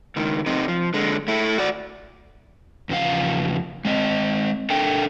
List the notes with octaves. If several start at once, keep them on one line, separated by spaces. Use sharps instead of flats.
C#2 D#3
C3 D#4
F3
D3 G#3
A3 E4
F#4 D5
E2 C#3 F3 F5
G#3 C4 D#5
D4 A4 A#4 E5 G5